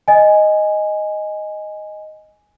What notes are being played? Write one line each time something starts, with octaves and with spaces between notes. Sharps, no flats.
D#5 G#5